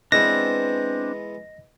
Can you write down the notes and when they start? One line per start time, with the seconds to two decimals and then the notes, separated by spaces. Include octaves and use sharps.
0.12 E3 G#3 B3 C4 D4 D#5 A#6